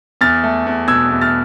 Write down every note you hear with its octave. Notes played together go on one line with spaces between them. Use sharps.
E2 F6 A6
A3
E2
B2 E6 G#6
E2
F6 A6